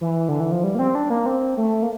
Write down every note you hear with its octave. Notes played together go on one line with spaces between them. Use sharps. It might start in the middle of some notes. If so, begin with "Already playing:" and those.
E3
D3
E3
F3
G3
A#3
C4
D4
A#3
C4
A3
A#3